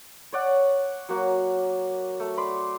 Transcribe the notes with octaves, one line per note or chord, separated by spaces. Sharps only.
C#5 D5 F#5
F#3 A#3 F#4
A3
D5 B5 C6 D6